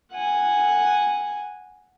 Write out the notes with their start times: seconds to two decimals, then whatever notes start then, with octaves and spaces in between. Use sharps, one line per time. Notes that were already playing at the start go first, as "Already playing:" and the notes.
0.12 F#5 G#5